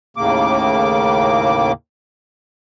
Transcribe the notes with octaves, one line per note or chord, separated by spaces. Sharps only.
D#2 A2 C#3 A#3 D6